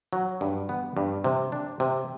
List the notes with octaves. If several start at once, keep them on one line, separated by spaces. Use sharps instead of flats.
F#3
G2
B3
G2
C3
D4
C3